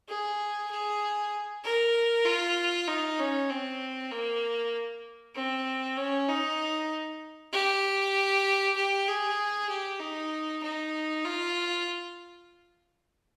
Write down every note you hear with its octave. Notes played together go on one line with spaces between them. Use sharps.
G#4
G#4
A#4
F4
D#4
C#4
C4
A#3
C4
C#4
D#4
G4
G4
G#4
G4
D#4
D#4
F4